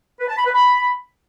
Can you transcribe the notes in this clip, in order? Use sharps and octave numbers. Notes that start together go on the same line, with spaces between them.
B4
A5
B5
B4
B5